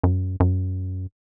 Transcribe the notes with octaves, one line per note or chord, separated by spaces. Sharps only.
F#2
F#2